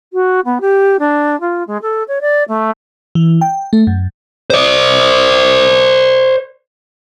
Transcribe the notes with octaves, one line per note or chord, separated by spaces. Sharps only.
F#4
B3
G4
D4
F4
G#3
A4
C#5
D5
A3
E3
G5
A3
F#2
C5 D5